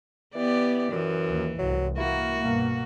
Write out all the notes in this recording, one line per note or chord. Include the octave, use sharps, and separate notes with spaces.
E3 B3 G4 D5
F#2 E3
D#2
C2 G#2 F#3
A#3 E4 F#4
G2 B2 A#3